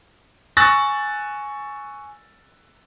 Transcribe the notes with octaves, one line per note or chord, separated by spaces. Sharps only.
G#5 C#6 E6 F#6 A6 A#6